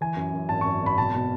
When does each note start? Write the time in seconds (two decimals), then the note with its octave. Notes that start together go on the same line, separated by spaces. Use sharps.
0.01 E3 G#5
0.17 F#2
0.33 F#2
0.49 G#1 A5
0.61 C#6
0.66 F#2
0.82 G#1 B5
0.98 B1 A5
1.15 B2